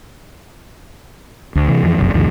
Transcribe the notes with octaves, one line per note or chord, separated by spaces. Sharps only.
D2
C3 E3
F2 E3
F1 B1 F#2
C2 F2 A#2 D#3